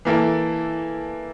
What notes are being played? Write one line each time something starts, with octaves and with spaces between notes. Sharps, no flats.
E3 A#3 E4 A4